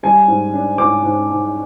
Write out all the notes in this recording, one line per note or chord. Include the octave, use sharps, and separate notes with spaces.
G3 G#5
G#2
D4
G#2 D6
G#2
G#2